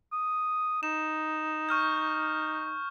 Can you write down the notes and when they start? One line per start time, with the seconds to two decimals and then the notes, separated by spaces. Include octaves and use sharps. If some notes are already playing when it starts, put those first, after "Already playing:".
0.12 D#6
0.83 D#4 E7
1.69 C#6 F6 G6